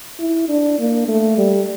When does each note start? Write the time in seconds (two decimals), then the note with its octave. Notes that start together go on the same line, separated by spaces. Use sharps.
0.19 E4
0.49 D4
0.79 A#3
1.08 A3
1.38 G3